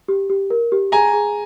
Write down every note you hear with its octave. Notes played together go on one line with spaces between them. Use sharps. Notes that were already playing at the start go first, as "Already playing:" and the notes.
G4
G4
A#4
G4
G#4 G#5 A#5
G#4